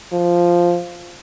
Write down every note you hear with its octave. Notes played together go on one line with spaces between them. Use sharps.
F3